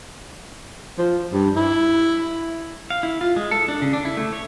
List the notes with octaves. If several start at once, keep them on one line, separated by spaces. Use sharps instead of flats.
F3
G2
E4
F5
E4
F4
G#3
A4
D4
C#3
D4
E4
A3
C#5